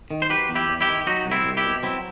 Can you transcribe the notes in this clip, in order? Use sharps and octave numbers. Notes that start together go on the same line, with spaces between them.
D#3
C5
F#3 G4 B4
E2
E4 G4
E2
E4 G4
D#3
F#3 D#4 F#4
C2
C4 E4
C2
E4 G4
B2
F#3 C4 E4